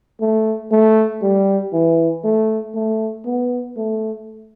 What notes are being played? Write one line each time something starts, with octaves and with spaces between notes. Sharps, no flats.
A3
A3
G3
E3
A3
A3
B3
A3